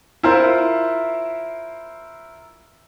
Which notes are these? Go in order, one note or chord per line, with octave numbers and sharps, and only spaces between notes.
E4 F4 A#4 C5 E5